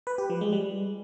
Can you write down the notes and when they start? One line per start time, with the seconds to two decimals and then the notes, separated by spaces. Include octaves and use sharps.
0.07 B4
0.18 G4
0.30 F3
0.41 G#3
0.53 G3